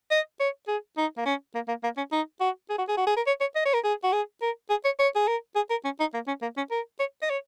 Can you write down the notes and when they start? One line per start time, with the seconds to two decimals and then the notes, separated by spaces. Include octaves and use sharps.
0.11 D#5
0.40 C#5
0.68 G#4
0.97 D#4
1.17 A#3
1.25 C#4
1.55 A#3
1.68 A#3
1.83 A#3
1.97 C#4
2.12 D#4
2.40 F#4
2.70 G#4
2.78 F#4
2.88 G#4
2.97 F#4
3.07 G#4
3.16 A#4
3.27 C#5
3.41 C#5
3.56 D#5
3.65 C#5
3.74 A#4
3.84 G#4
4.03 F#4
4.12 G#4
4.42 A#4
4.70 G#4
4.85 C#5
4.99 C#5
5.15 G#4
5.27 A#4
5.56 G#4
5.70 A#4
5.85 C#4
6.00 D#4
6.14 A#3
6.27 C#4
6.42 A#3
6.57 C#4
6.71 A#4
6.99 C#5
7.22 D#5
7.30 C#5